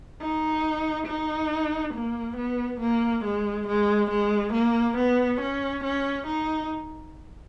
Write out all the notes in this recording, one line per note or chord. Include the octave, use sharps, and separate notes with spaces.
D#4
D#4
A#3
B3
A#3
G#3
G#3
G#3
A#3
B3
C#4
C#4
D#4